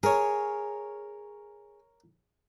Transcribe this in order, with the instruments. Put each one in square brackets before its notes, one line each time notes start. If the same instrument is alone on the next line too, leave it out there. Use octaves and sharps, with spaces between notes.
[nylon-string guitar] G#4 [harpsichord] A#4 C#5